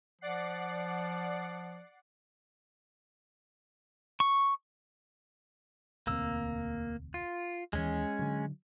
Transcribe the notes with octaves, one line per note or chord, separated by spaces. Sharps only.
F3 D5 F#5 C7
C#6
E1 D2 A#3 C4 E6
F4
D#2 E3 G#3 C#4
D3 F#3